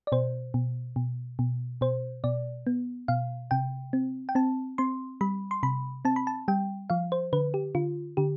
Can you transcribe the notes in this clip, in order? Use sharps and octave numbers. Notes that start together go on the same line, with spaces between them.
D5
B2 C5
B2
B2
B2
B2 C5
B2 D5
B3
B2 F5
C3 G5
C4
G5
C4 A5
C4 C6
G3 B5
C6
C3 B5
C4 A5
B5
A5
G3 G5
F3 F5
C5
D3 B4
G4
D3 F4
D3 G4